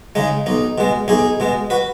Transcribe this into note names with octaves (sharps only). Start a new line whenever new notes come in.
C#3 G#3 D#4
B1 D#4
B2 G#3
B1 D#4 G#4
B2 G#3
F#4 B4